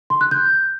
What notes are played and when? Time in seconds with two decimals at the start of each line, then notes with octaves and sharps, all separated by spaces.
0.10 C6
0.21 F#6
0.31 G6